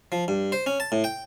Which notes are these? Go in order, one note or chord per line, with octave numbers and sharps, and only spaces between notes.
F3
G2
C5
C#4
A5
A2
G5